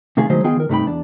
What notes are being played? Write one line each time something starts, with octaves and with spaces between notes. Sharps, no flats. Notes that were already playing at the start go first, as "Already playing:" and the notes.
C3 D#3 A3 F4 G#4
B1 D#3 F#3 G#3 A3 C5
D#3 B3 F4 G#4 D#5 G5
D#3 A#4
G2 C3 A3 D#4 G5 B5
E2 D4